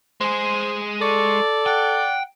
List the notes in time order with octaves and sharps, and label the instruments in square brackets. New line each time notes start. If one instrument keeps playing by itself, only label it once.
[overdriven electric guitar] G#3 G#4 [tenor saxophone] C5
[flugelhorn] A4 [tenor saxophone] D5 [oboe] C#6
[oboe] F#5 [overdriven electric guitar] G5